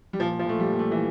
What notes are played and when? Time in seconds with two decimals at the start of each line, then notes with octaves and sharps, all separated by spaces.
0.13 G3
0.19 A#2 F3
0.39 F3
0.45 A#2 A3
0.60 G3
0.72 A#2
0.79 A3
0.91 E3